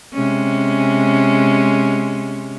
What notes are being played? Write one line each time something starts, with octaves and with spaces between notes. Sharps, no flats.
C3 G#3 C#4